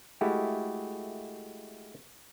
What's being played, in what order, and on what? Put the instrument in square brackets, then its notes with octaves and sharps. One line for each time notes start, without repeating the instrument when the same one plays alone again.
[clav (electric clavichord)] G#3 A3 E4 F#4 G4